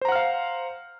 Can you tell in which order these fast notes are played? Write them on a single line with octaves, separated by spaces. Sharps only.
C5 A#5 F#5 F6 F5